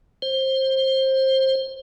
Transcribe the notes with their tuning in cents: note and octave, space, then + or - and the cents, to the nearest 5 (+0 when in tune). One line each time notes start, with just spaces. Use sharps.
C5 +20